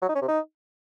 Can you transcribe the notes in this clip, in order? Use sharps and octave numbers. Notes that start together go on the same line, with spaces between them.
F#3
D#4
C#4
C3
D#4